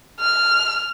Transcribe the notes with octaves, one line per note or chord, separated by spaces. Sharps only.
F6